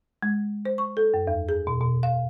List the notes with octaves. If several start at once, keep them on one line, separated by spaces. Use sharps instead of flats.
G#3
C5
C#6
A4
F#2
E2
G#4
B2
B2
F5